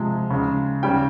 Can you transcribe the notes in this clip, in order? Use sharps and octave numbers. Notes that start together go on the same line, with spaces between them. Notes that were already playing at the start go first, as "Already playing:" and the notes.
Already playing: C3 F3 G#3
C#3 G#3
C#3 G3 G5